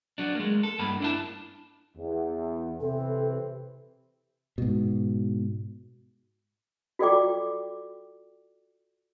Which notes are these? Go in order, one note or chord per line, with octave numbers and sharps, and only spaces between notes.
F#3 D4
G#3 A#3
A4
G2 A#3 B5
D4 E4 A5
E2
C3 E3 C4 A4
G#2 B2
F4 F#4 A4 D5 G5 D6